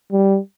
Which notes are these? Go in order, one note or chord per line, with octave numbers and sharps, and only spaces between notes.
G3